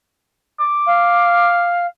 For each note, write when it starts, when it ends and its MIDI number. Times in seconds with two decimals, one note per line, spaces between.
0.60 1.68 86
0.86 1.86 77